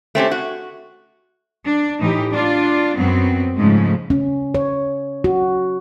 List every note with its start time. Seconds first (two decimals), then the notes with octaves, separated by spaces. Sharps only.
0.15 A3 C4 C#4 G4
0.31 F#4
1.65 D4
1.99 A2 E3 D#4 G4
2.32 D4 F4
2.96 F#2 F#3 B3 C4
3.57 G#2 C#3 F3 G#3 A3
4.10 C#4
4.55 C#5
5.24 F#4